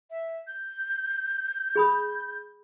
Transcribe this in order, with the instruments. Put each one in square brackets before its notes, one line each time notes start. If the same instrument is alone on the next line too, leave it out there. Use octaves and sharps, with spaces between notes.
[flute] E5
G6
[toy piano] G#4 B5 D#6